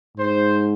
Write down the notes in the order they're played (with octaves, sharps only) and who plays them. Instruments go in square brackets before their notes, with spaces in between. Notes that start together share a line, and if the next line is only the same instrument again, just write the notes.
[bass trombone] G#2 [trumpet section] C5